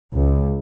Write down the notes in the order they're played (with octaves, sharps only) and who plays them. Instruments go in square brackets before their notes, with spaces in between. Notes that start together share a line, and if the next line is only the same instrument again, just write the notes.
[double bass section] C#2